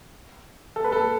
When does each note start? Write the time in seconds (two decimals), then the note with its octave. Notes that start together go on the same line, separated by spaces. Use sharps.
0.76 A4
0.84 B4
0.92 A4